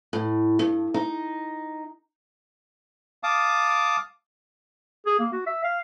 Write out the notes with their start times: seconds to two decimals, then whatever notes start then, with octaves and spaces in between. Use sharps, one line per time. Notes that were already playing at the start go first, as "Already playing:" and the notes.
0.13 A2
0.59 G2
0.94 D#4
3.23 F5 A5 D6 D#6
5.06 G#4
5.19 A#3
5.32 F#4
5.46 E5
5.64 F5